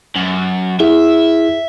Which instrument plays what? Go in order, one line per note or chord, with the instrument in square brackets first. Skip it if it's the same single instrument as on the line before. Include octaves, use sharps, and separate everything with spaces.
[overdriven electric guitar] F#2
[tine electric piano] E4 G#4 [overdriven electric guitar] E5